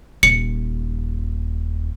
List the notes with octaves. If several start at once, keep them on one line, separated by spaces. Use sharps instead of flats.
D#1 C#7